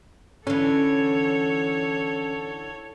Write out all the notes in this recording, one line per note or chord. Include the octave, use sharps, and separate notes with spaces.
D3 E3 C#4 A4 C#5